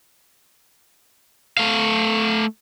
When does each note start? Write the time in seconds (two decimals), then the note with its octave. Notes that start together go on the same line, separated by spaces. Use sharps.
1.57 A3 F5